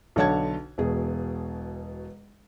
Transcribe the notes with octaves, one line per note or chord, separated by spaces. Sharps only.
B1 D3 C#5 F#5 A5 G#6
E1 B2 G#4